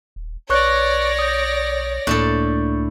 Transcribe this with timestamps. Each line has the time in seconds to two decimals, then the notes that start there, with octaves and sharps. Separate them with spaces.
0.16 D#1
0.50 B1 B4 C#5 D5 C#6 F#6 A#6
1.19 D#6 G6
2.07 C#2 A2 A#3 D4 A4 C#6 G6